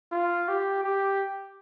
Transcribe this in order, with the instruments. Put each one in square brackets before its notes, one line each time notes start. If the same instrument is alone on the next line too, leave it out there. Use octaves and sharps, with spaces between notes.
[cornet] F4
G4
G4